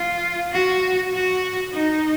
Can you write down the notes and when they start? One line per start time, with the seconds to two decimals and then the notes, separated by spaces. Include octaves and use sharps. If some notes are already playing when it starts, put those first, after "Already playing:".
Already playing: F4
0.53 F#4
1.13 F#4
1.73 D#4